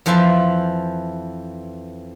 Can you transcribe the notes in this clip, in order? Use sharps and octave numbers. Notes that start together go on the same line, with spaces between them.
F2 E3 F3 C5 E5 A5